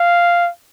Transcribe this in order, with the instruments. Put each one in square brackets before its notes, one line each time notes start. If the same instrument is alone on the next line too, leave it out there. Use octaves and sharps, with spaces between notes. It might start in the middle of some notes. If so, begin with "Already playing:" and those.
Already playing: [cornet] F5